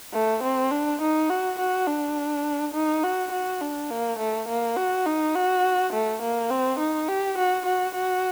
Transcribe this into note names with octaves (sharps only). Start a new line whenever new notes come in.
A3
C4
D4
D#4
F#4
F#4
D4
D#4
F#4
F#4
D4
A#3
A3
A#3
F#4
D#4
F#4
A3
A#3
C4
D#4
G4
F#4
F#4
F#4